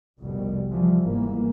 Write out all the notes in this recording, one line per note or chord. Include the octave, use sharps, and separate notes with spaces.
F1 C2 B2 G3
D3 E3 F3 G3
G1 G#2 E3 A#3